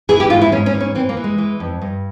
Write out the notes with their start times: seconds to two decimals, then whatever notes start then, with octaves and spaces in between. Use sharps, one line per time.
0.09 E3 G#4
0.20 G4
0.30 G#2 F4
0.42 E4
0.52 G#2 C#4
0.66 C#4
0.74 E3
0.80 C#4
0.95 E3 C4
1.09 A#3
1.17 E3
1.24 G#3
1.38 E3
1.60 F2
1.82 G2